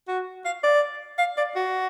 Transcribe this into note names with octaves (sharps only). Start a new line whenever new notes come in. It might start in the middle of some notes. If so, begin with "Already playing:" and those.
F#4
F5
D5
F5
D5
F#4